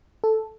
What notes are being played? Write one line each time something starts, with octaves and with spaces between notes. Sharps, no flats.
A4